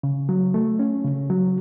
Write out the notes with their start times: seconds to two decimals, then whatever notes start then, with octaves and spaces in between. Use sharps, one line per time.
0.03 C#3
0.29 F#3
0.54 A3
0.79 C#4
1.05 C#3
1.30 F#3